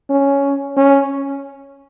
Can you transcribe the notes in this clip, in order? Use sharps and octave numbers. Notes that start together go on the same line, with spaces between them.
C#4
C#4